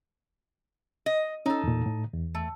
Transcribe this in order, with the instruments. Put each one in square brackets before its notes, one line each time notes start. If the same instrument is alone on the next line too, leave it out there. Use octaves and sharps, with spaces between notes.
[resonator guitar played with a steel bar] D#5
[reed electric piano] C#4 [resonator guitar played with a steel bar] D#4 A4
[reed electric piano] E2 A#2
A2
E2
[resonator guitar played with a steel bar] A3